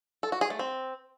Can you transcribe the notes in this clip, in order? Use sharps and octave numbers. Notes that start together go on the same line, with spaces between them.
A4
F#4
G#4
A3
C4